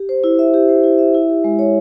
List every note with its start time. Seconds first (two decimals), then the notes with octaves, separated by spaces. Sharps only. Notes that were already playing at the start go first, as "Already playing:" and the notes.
Already playing: G4
0.09 C5
0.24 E4
0.39 E5
0.54 G4
0.69 C5
0.84 E4
0.99 E5
1.14 E4
1.29 G4
1.44 G#3
1.59 C#5